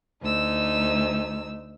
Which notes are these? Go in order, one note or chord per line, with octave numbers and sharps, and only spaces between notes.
D2 D#4 E6